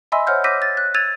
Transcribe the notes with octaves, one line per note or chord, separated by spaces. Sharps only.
D#5 E5 G#5 B5 C6 E6
C5 C#5 F#5 F6 G6
D6 E6 G6 A#6 B6 D#7
A6
F#6
E6 G#6 A6 D#7 F7